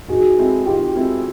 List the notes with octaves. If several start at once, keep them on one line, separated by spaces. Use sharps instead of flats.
D#3 F#4 G#4
G#3 C4 E4 A4
D#3 F4 G4
G#3 C4 E4 A4